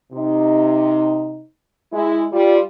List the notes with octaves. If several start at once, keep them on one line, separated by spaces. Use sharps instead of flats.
C3 D#4
G#3 E4
G3 F4